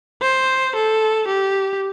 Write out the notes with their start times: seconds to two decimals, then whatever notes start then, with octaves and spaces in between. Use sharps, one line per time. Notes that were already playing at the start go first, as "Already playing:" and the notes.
0.22 C5
0.75 A4
1.28 G4